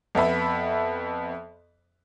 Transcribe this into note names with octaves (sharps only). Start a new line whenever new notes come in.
F2 B3 E5 B5